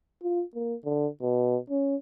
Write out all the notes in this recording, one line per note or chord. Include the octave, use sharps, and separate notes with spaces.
F4
A#3
D3
B2
C#4